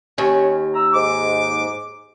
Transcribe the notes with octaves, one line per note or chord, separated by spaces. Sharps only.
D#2 C#4
A#5 E6
G#2 D6